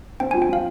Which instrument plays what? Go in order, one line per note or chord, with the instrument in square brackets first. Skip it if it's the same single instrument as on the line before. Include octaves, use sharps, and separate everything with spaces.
[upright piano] C4 [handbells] G5
[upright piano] F3 [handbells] G#5
[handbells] G5
[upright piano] F3 [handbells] F5